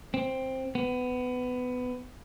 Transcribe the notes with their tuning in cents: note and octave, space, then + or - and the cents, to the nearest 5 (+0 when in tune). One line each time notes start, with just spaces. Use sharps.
C4 +5
B3 +20